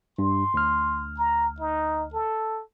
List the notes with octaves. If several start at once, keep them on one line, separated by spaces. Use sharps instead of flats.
G2 C6
D2 F6
A#5
D#4
A4